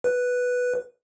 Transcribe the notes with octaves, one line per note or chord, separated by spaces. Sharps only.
B4